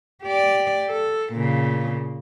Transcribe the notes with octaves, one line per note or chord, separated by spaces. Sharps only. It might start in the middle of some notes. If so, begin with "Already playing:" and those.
G4 D5
A4
A#2 C#3